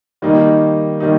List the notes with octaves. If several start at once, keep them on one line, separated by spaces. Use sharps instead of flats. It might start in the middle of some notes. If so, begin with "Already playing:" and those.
D#3 G3 A#3 D#4
D#3 G3 A#3 D#4